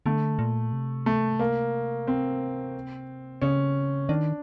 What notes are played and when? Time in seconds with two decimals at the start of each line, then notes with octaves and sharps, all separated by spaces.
0.06 D3 A3
0.39 A#2
0.73 C3
1.06 A3
1.39 A#3
2.07 C4
3.42 C#3 C#4
4.09 D#3 D4